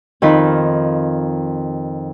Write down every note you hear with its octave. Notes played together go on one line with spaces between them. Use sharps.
F2 D#3 F4 B5